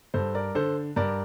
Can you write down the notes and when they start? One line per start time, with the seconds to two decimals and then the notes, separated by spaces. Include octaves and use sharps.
0.14 G2 A4 C5
0.34 A#4 D5
0.55 D3 A4 C5
0.96 G2 A#4 D5